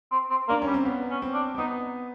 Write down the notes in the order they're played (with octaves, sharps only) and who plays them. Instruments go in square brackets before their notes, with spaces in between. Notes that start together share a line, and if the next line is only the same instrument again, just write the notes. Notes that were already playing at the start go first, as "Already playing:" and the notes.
[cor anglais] C4
C4
[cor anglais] A#3 [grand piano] D4
[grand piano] C#4
[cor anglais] G3
[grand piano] C4
B3
[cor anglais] C#4
[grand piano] C4
[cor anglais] D4
[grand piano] C4
[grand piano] B3 [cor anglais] D#4